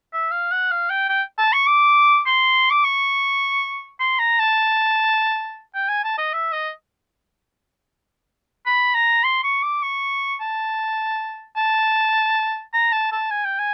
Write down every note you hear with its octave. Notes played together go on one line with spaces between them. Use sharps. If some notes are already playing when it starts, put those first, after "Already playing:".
E5
F5
F#5
F5
G5
G5
A5
C#6
D6
C6
D6
C#6
C6
A#5
A5
G5
G#5
A5
D#5
E5
D#5
B5
A#5
C6
C#6
D6
C#6
A5
A5
A#5
A5
A5
G#5
G5
G#5